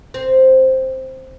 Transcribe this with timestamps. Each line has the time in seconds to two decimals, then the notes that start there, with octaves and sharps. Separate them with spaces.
0.14 C4